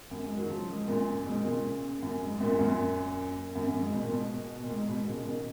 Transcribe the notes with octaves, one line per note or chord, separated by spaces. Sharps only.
F#2
G#2
D#3 F#3
C#3 F3
G#2
F#2 A#2
G#2 B2
A#2 C#3
F#2
G#2
G#2
F#2 A#2
F#2 A#2
F#2
F#2
G#2
B2
A#2
G#2 B2
A#2
G#2
G#2 B2
A#2 C#3
B2 D#3